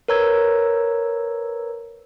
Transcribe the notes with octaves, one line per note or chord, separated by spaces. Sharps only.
A#4 B4 C#5 A#5 E6 G#6